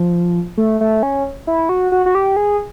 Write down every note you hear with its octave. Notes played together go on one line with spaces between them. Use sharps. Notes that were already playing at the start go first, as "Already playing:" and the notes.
Already playing: F3
A3
A3
C#4
E4
F#4
F#4
F#4
G4
G#4